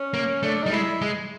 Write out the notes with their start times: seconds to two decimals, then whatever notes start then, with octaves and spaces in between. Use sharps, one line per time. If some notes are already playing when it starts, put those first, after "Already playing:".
Already playing: C#4
0.14 A#3
0.43 A3 D4
0.62 G3 D#4
0.72 G#3 E4
1.02 G#3